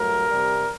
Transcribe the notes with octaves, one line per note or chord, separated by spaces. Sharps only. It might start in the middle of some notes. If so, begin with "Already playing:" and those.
Already playing: G2 F#3 A3 A#4
C3 G3